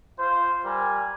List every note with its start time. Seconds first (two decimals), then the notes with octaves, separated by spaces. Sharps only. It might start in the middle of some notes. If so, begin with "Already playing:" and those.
0.19 F4 C5
0.65 G3 A#4 G#5